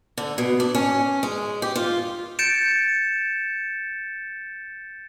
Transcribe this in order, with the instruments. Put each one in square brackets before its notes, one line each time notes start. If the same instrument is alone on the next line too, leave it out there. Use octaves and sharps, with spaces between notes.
[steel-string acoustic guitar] D3
B2
D4
C#4
G#3
G4
F4
[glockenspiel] G6 A6 C#7 D7 E7